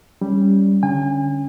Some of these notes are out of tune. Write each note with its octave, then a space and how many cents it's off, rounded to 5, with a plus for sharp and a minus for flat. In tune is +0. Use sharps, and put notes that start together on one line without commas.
G3 +0 C#4 +0
D3 -10 C#4 +0 G#5 -40